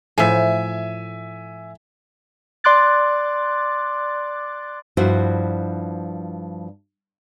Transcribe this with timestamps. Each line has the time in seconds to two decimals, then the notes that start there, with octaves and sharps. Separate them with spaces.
0.18 A2 F3 E5 G#5
2.64 D5 C6 D6 F#6 A6
4.97 G2 F3 E4 F#4 C5